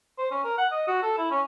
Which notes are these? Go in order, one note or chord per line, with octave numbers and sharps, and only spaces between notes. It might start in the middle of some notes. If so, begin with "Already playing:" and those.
C5
C#4
A#4
F#5
D#5
F#4
A4
E4
C#4